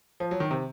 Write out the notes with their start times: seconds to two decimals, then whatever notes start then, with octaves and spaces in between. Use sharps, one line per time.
0.20 F3
0.31 F#3
0.40 D#3
0.51 C3